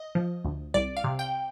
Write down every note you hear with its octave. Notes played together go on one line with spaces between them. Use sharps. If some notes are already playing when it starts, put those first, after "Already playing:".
Already playing: D#5
F3
D2
C2 D5
F5
C3
G5